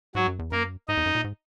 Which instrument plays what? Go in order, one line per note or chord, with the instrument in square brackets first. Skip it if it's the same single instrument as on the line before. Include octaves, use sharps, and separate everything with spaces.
[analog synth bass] G#2 [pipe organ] F#3 F#4
[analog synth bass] F#2
E2
[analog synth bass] F#2 [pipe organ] A#3 A#4
[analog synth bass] G#2 [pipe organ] D#4 D#5
[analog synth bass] E2
F#2
A#2
G#2